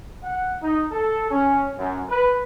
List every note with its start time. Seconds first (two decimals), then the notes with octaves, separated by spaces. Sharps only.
0.24 F#5
0.61 D#4
0.91 A4
1.30 C#4
1.77 F#2
2.08 B4